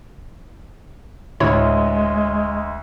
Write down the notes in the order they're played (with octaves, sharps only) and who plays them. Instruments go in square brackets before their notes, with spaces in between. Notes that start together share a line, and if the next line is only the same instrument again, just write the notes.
[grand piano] D2 [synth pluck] A2 E4 C#5 [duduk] G#3